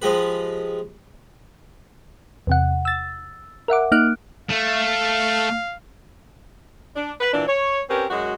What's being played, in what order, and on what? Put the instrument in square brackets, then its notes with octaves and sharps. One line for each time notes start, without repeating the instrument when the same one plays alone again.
[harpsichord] F3 G#3 G4 B4
[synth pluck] E2 C3 F#5
E6 A6
A#4 E5 F#5 D6
A#3 D#4 F6 F#6 D7
[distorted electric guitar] A3 [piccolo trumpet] F5
[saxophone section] D4
B4
A#2 E3 D4
C#5
C4 C#4 G4 A#4 B4
F#2 G#3 F#4